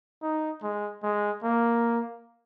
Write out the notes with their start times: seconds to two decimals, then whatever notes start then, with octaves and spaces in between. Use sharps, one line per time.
0.23 D#4
0.63 G#3
1.03 G#3
1.43 A#3